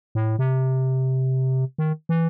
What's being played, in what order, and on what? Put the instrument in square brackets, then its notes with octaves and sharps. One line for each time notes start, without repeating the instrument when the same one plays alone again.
[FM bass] A2
C3
D#3
E3